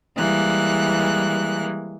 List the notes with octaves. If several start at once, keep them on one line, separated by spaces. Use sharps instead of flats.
E3 G3 G#3 A#3 F#6